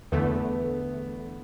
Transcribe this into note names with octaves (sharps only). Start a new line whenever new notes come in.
E2 D3 A3 B3